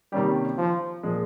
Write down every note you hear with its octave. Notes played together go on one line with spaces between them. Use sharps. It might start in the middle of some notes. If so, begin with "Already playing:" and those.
C3 D#3 G3 A#3 C#4 G4
F3
A#2 F3 G#3